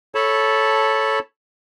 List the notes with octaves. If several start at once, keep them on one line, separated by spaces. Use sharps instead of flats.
A4 C#5 A5 B5